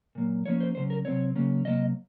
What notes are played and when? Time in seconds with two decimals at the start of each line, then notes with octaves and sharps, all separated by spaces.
0.15 A#2 F#3 A#3
0.46 F3 A#3 C#4 C#5
0.60 C5
0.75 C#3 F#3 C#4 C5
0.90 A#4
1.05 C3 F#3 C4 C#5
1.35 C#3 F#3 A#3 C#4
1.65 C3 F#3 A#3 D#5